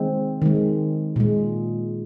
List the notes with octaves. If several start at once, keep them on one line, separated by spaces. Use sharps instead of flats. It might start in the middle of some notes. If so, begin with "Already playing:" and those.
Already playing: D#3 G#3 C4
D#3 G#3
A#2 G#3